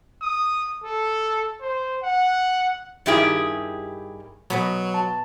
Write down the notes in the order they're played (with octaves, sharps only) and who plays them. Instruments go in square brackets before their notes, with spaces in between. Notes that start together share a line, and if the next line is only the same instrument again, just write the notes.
[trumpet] D#6
A4
C5
F#5
[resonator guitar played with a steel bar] G2 D#3 E4 G4 G#4
[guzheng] B2 B3 D#5 [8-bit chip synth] F#3
[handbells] A5